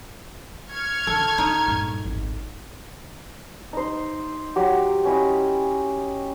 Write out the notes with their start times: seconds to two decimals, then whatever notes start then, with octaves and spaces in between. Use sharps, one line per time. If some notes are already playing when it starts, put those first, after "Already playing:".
0.69 C#6 F6 G#6
1.07 D3 D#3 A4
1.38 D4 D#4
1.66 G2 A#2
2.05 G#1 C#2
3.73 D#4 C5
4.56 F#3 G4
5.05 C#4 E4 D#5